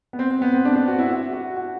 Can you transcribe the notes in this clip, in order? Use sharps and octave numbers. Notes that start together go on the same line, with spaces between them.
B3
C4
C4
B3
C4
D4
D4
F#4
E4
F#4
F#4
F#4